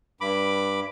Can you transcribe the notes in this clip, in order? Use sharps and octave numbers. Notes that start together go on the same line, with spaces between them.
G2 B5 D6